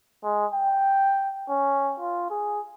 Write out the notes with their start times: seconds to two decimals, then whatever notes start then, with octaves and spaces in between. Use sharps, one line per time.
0.24 G#3
0.54 G5
1.49 C#4
2.00 F4
2.30 G#4